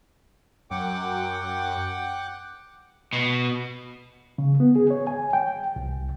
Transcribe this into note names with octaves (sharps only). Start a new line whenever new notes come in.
F#2 F#5 G5 D6
B2
C#3
B3
G#4
C#5
G#5
G5
C2